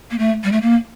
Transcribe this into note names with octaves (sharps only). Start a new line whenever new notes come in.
A#3
A3
G3
A3
A#3